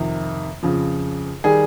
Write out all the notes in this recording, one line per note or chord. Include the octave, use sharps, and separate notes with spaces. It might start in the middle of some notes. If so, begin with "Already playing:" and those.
Already playing: F2 C3 D#3
F2 C#3 F3
D#3 G3 G#4